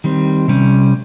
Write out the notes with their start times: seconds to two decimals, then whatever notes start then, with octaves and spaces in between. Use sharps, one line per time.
0.04 D#3 G3 C4
0.48 C3 G3 C#4